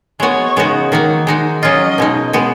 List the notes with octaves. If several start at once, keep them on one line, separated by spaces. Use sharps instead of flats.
G#3 B3 F#4 C#5
C#3 G#3 B3 D#4 F#4
D#3 A#3 D#4 F#4
G#3 D#4 F#4
F#3 C#4 F4 D#5
B2 G#3 D#4
G#3 B3 F#4